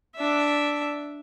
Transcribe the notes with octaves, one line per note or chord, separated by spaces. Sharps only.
D4 E5